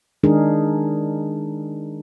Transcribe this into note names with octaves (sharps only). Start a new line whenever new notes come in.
D#3 G#3 D4 D#4 G#4 A#4